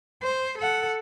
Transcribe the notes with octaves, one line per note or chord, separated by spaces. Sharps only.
C5
A4 F#5